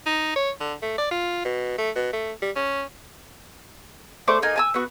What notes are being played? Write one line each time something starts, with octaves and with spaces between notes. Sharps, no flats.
D#4
C#5
D3
A3
D5
F4
B2
A3
B2
A3
G3
C#4
A3 C5 D5 D6
A#3 D#4 G#5
G#5 A5 E6
B3 F#4